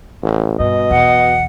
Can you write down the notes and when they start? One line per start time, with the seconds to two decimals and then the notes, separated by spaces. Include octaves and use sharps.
0.22 A1
0.59 G2 B2 D#5
0.90 B1 E2 F#5